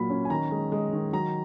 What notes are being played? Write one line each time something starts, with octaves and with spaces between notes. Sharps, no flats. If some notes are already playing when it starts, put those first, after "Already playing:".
Already playing: A#2 F#3 A#3 B5
C#4
G#5
D#3 A#5
G#3
G#3
D#3
F#3 A#5